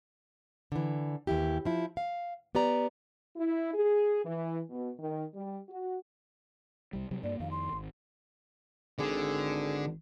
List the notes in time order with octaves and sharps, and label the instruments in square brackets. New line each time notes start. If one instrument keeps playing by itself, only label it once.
[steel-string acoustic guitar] D3 E3
D#2 E3 E4 G4
F3 E4
F5
B3 G4 D5 A#5
[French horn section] E4
G#4
E3
B2
D#3
G3
F#4
[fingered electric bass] C2 G3
C3 F#3 G3
[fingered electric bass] G2 A#3 [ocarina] D5
[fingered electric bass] F2 D#3 [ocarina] F5
[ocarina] C6
[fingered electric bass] G#1
[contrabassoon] G#1 [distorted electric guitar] D3 [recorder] G#4